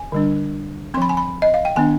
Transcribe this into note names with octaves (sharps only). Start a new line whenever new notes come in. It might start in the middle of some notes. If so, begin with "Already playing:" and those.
Already playing: G#5
D3 G3 D4
F3 C4 B5 C6
G#5
B5
D#5
F5
G5
D#3 B3 D4 G#5